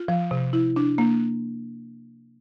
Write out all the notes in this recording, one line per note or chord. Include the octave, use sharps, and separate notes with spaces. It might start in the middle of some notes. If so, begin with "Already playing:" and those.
Already playing: F4
F3
C3
E4
D4
A#3